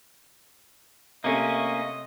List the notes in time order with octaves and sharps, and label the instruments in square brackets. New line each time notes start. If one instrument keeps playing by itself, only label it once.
[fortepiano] C3 A3 [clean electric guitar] A#3 C#4 [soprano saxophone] D#5 [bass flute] E5